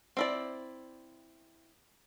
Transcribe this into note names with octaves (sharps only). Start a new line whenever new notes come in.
C4 E4 D5